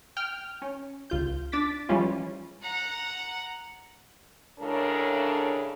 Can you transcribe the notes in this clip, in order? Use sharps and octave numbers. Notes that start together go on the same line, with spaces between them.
G5 F6
C#4
C#2 F4 G6
D4 D6 A6 B6
E3 F3 G3 G#3 C#4 F4
F#5 A#5
A2 C#3 G#3 D4 A4 A#4